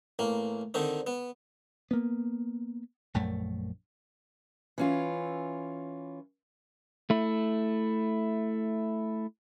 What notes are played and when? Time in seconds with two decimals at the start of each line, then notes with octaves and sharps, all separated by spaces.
0.19 A1 A#3
0.74 D3 D#3 C4 D#4
1.07 B3
1.91 A#3 B3
3.14 A#1 F#2 A3
4.78 E3 C#4 F4
7.10 A3 E4